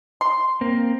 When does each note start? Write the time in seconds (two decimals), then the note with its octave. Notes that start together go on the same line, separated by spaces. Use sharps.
0.21 C6
0.61 A#3 C4